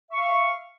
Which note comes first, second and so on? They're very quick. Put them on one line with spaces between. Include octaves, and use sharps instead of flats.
E5 C#6 F5